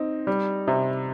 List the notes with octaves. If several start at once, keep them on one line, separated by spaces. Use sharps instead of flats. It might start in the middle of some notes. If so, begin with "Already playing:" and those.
Already playing: C4 D#4
G3
C3